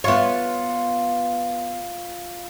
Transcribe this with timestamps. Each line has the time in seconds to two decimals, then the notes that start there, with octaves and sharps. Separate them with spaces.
0.04 B3 F4 C#5